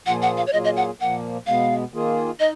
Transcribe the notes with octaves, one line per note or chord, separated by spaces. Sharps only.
A#2 F3 A#3 F4 G#4 F#5
F#5
F5
C#5
A#2 F#3 A#3 F4 G#4 D#5
D#5
F#5
A#2 F3 A#3 F#5
B2 G#3 B3 F5
D#3 A#3 F4 G#4
D#4 D#5